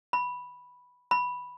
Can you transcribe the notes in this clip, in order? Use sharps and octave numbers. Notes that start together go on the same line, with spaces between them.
B5
B5